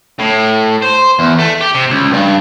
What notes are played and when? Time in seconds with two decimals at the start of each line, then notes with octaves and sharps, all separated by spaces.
0.19 A2
0.82 C5
1.19 E2
1.39 A3
1.61 G4
1.75 C3
1.90 C#2
2.13 G2